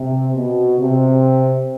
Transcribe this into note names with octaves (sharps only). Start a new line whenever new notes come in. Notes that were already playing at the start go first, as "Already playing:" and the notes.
Already playing: C3
B2
C3